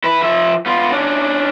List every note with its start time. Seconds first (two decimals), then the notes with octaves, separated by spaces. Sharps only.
0.04 E4 B4
0.22 F3 E5
0.66 B3 F4
0.92 C#4 D4